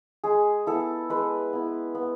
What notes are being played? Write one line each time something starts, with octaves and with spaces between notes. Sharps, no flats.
G#3 G#4
B3 E4 A4
G#3 B4
B3 E4
B3